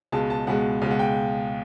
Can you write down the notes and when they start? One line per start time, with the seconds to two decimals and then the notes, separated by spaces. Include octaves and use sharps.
0.12 C#2 B2 G#3 A5
0.30 A5
0.47 C#2 B2 G#3 F#5
0.81 C#2 B2 G#3 F5
0.91 F#5
0.99 G5